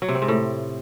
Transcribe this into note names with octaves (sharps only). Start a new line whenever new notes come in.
F#3
C3
C4
G#2
A2